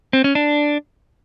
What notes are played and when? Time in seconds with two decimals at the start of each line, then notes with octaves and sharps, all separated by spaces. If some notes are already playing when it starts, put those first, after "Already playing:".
0.13 C4
0.24 C#4
0.35 D4